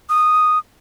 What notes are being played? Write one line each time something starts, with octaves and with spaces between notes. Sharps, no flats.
D#6